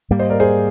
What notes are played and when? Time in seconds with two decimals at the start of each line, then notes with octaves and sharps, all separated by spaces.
0.10 G#2 G3 A#3
0.19 C5 D#5
0.30 A#4 D5
0.40 G#4 C5